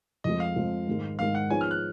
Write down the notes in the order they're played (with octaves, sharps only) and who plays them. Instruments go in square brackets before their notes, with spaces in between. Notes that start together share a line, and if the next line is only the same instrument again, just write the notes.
[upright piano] F2 F3 G#3 [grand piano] D#5
[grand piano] F5
[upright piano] F2 F3 G#3
G#2 D#3 G#3
[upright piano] G#2 D#3 G#3 [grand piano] F5
[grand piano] F#5
[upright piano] F3 B3 D#4 G#4 C#5 [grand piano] G#5
[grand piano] F6
F#6